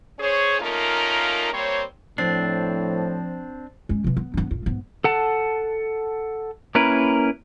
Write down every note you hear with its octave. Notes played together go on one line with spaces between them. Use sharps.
C#4 G#4 C5 C#5
A3 A#3 C#4 D#4 F4 A#4
G3 A#3 C4 C5 C#5
A2 F3 C4 D4 C5 A6 C7
G#3 C#4
C3 E3
B3
B3 D4
D#1 F4
G#2 B3
A4 F#5 A5
A#3 C#4 E4 A#4 B4